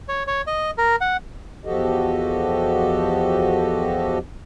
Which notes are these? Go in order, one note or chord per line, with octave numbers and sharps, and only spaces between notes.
C#5
C#5
D#5
A#4
F#5
E2 F3 F#4 G4 A4 D#5